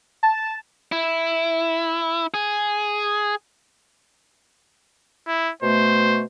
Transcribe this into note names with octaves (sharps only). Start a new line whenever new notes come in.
A5
E4
G#4
E4
B2 A3 C5